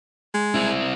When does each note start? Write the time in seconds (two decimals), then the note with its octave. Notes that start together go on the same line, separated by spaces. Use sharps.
0.34 G#3
0.55 C4 E4